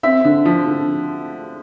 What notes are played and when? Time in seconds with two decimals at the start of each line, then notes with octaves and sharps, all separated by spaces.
0.03 C4 E5
0.25 D3
0.45 F3
0.66 D3